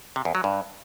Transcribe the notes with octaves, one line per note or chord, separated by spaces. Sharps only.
C3
E2
F#3
G2